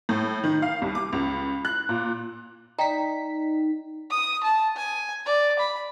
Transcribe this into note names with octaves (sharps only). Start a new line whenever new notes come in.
A2
D#3
F5
C2
D6
C#2
F#6
A#2
D#4 D5 G5 A#5 B6
D#6
A5
G#5
D5
B5